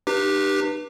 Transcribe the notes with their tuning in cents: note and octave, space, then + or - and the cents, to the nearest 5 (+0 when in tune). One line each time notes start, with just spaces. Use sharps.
D#4 -45 G4 +0 B4 -30